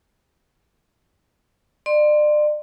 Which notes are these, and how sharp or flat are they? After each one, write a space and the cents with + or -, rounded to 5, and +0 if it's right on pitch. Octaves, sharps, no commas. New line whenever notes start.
D5 +35 C6 +0